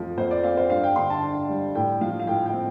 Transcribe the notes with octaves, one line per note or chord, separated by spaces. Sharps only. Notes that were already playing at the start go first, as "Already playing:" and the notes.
Already playing: F2 F3 A3 A4
F2 C5
D5
C4 F5
C5
G2 F5
G5
D3 C6
A5
D4
G3
A2 G5
F3 F5
F5
A2 G5
G5
C4